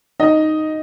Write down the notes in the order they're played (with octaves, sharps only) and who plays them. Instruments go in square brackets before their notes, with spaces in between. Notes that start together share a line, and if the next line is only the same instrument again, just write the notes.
[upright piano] D#4 D#5